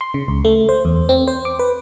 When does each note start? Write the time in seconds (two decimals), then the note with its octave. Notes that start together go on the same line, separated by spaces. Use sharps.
0.01 C6
0.14 C#3
0.28 C#2
0.45 A3
0.69 C5
0.85 E2
1.09 C4
1.28 C5
1.45 D6
1.59 B4